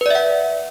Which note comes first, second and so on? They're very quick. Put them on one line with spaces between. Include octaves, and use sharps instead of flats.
B4 D5 E5 F#5